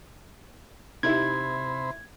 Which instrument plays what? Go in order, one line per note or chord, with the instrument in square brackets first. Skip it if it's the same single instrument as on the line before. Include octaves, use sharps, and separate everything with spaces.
[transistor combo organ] C3 C5 B5 [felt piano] D#4 E4 G4 [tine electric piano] G#6